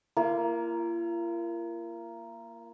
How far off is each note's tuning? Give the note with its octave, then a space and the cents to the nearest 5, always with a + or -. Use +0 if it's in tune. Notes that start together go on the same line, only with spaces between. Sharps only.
A#3 +0 F4 -45